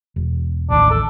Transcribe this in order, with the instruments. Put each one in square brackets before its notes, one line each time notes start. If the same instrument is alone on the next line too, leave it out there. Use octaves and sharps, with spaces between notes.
[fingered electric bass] E1
[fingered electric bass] A1 D#2 [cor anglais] D4
[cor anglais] A4